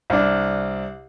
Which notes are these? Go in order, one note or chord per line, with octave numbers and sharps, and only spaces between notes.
C2 D4